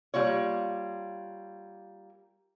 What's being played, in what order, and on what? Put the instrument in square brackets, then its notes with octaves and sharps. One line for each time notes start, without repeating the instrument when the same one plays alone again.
[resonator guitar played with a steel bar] G3 A#3 F4 C#5